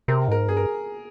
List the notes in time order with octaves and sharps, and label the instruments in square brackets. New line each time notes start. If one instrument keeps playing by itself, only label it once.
[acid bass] C3 [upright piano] A#4
[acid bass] G#2 [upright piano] A#4
[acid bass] G2 [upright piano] G#4
[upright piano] A#4